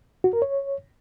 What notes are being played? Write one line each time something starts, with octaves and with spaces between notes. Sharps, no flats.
F#4
A#4
C#5